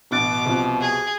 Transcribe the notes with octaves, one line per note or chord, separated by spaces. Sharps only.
A1 B2 D6 F#6 A6
C2 F3
G#4